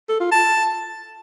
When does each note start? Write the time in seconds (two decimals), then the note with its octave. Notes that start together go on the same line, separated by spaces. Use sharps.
0.09 A4
0.20 F4
0.32 A5